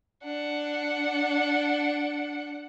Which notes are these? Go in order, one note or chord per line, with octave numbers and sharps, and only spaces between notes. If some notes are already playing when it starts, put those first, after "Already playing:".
D4 F#5